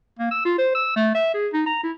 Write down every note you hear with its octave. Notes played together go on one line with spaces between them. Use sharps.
A#3
E6
F4
C5
E6
A3
E5
G#4
D#4
A#5
E4